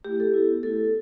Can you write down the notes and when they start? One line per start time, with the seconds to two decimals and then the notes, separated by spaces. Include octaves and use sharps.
0.05 A3 E4 G4
0.20 A4
0.34 B3 E4
0.62 A3 E4 A4